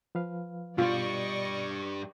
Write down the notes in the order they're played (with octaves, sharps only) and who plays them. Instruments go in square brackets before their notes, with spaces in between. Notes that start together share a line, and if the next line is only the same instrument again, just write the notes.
[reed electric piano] F3 B4 F5
[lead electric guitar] G2 G3 [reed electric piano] B2 [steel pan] F4 [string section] D5 D#5 C#6